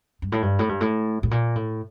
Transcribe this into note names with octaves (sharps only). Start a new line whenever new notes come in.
G2
A2
G2
A2
G2
A2
A2
A#2
A2